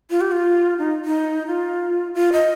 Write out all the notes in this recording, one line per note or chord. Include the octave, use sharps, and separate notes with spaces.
F4
G4
F4
D#4
D#4
F4
F4
D#5